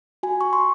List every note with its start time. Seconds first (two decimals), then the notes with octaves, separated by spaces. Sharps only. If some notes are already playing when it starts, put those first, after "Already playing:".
0.23 F#4 G#5
0.41 F#4 C#6
0.53 C6